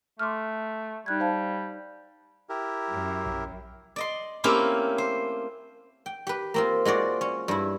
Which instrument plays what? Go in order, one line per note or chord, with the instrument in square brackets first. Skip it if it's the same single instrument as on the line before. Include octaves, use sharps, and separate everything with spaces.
[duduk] A3 [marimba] C6 D6 F6
[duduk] G3 [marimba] D#4 F#6 G#6
[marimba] C5 F5 A5
[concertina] E4 G4 A#4
[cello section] F#2
[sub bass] A#1
[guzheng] D5 D#5 C6
A3 A#3 C4 C#4 E4 G4
C5
G5
G4 B4
A#3 C4 F4
G#3 F4 F#4 D5
C#4
G2 E4